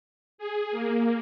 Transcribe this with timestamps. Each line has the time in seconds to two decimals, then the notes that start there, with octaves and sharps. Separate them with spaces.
0.38 G#4
0.71 A#3